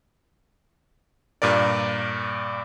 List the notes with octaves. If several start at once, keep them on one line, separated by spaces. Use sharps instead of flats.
G2 A#2 A#4 D5